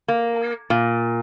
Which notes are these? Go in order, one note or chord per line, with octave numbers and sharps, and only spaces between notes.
A#3
A#2